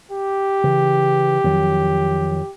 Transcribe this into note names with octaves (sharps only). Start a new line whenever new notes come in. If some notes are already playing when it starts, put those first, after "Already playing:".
G4
C#3 E3
F2 D#3 F#3